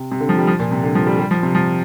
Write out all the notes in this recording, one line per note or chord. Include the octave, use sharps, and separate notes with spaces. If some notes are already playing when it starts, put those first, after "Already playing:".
Already playing: C3
C3
D3
F3
G3
F3
A#2
C3
D3
F3
G3
G3
F3
C3
F3